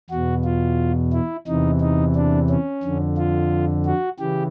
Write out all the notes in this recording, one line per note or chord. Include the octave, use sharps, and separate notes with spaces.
E2 B2 F#4
F4
E4
E2 C3 E3 D#4
D#4
D4
C#4
F2 D3
F4
F#4
C#3 E3 G4